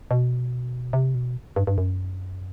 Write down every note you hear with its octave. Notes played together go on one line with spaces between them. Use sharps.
B2
C3
B2
G2
G2
F#2